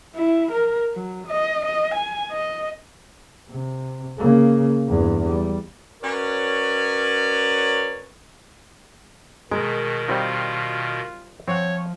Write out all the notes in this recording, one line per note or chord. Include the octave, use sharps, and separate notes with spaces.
E4
A#4
F#3
D#5
D#5
G#5
D#5
C3
C#3 A#3
E2 G2
G3
C#4 F#4 A#4 B4 C#5 D5
B2 D#3 G#3 A#4
G3 C4 D#4 F4
F3 C4 C#5 F#5